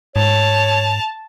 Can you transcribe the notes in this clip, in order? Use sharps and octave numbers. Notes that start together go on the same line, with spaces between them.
G#2 C#5 A5 F7